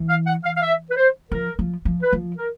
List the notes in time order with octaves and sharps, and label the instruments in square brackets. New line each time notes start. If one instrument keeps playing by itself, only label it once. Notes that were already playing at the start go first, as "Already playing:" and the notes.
Already playing: [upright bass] E3
[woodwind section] F5
F#5
F5
F5
E5
B4
C5
[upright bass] F3 [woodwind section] A#4
[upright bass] F3
F3
[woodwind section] B4
[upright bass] F3
[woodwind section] A#4